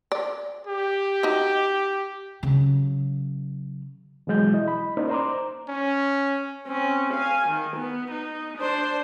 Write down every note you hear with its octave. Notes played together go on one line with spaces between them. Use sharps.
D5
G4
D#4 F#4
C#3 F#3
B2 E3 F#3 G#3 G6
E4 D#5
B5
A#3 C#4 D#4 C5 D5
C5 A#5 C6 D6
C#4
C4 C#4
F5 G#5
D#3
B3
D#4
D4 C5